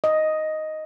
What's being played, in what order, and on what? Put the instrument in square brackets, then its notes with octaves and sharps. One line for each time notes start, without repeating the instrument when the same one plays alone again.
[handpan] D#5